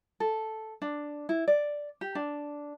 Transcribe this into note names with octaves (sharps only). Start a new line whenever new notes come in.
A4
D4
E4
D5
G4
D4